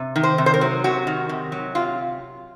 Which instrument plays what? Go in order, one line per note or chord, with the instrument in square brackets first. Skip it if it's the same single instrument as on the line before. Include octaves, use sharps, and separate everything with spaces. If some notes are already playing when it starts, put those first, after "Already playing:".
Already playing: [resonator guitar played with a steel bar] C3
D#3
C5
C3
C5
A#4
F#3
C3 F#4
D#3
C3
F#3
C3 F4